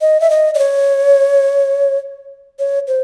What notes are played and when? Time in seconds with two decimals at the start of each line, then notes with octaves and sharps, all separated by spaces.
0.01 D#5
0.21 E5
0.30 D#5
0.54 D5
0.59 C#5
2.59 C#5
2.87 C5